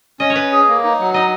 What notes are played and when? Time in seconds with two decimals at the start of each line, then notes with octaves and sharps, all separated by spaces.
0.20 C#4 D#5
0.30 C#5
0.36 C#4 B4
0.52 G#4
0.68 A#3
0.84 D#4
1.00 F#3
1.14 D#4 D#5